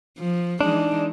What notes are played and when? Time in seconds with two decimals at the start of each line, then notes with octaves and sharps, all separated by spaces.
0.18 F3
0.61 E3 G#3 D4 D#4